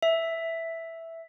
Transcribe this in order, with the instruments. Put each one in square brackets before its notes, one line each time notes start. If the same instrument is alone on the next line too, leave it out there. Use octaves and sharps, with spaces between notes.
[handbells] E5